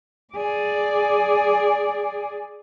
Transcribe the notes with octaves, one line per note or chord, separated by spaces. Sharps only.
G#4 D5